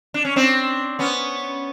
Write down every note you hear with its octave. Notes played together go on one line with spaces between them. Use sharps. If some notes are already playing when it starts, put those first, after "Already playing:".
D4
C#4
C4 D4
B3 C#4